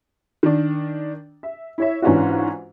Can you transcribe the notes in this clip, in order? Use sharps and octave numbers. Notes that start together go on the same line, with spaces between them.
D#3 D4
E5
E4 C#5 E5
G#2 E3 C#4 D4 F4 F#4